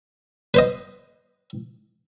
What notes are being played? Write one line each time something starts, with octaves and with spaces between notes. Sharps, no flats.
B4 C5 D#5